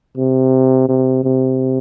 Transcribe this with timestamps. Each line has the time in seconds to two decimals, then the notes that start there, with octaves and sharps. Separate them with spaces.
0.17 C3
0.88 C3
1.24 C3